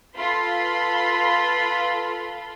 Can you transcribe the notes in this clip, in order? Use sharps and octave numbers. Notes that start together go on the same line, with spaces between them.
F4 A4 B4 B5 C6